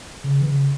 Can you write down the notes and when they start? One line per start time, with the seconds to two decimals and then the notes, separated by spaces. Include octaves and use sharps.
0.24 C#3
0.41 E3
0.47 C#3